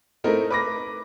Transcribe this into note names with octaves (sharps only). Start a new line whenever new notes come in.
A3 C4 D#4 E4 A4 A#4
B4 D6 A#6